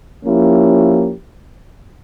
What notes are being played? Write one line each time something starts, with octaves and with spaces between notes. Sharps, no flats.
F3 A#3 C#4 E4 G4